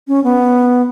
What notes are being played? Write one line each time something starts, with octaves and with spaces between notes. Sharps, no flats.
C#4
B3